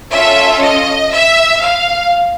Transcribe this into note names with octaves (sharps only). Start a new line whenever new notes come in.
C#4 F4 A4 E5
D#5
E5
F5